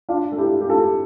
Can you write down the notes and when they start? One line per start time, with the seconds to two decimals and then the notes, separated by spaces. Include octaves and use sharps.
0.09 D4 F4
0.32 A4
0.38 E4 G4
0.61 G4
0.69 F4 A4